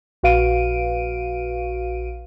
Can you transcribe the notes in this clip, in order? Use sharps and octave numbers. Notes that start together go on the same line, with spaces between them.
A#1 F#4 B4 F5 D7 D#7